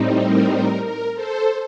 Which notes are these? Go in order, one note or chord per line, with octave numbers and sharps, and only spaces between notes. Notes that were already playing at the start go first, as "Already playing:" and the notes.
Already playing: A2 G3 C4 D#4
A#4
A#4
A#4
A4 C5